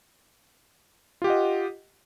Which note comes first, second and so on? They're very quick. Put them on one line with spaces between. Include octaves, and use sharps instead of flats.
F4 G4 F#5 D#5